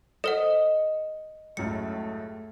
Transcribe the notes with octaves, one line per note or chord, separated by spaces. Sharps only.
A4 C5 D#5 F#5 C#7
C#2 F#2 A2 A3 C#7